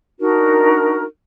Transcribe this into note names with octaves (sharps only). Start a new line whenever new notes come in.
D4 D#4 F#4 A#4